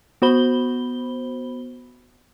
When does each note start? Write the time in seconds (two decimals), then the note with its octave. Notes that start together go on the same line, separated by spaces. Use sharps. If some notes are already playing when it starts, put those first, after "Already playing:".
0.22 B3 F#4 C5 B5 G7